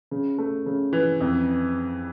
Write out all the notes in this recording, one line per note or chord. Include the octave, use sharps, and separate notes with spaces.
C#3
A3
C#3
E3
F2